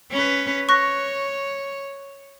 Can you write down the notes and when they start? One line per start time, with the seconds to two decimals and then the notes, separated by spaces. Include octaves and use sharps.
0.11 C#4 B4
0.69 C#5 C#6 F#6 A#6